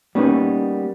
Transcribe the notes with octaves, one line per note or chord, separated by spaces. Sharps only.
G3 A#3 B3 C#4 D#4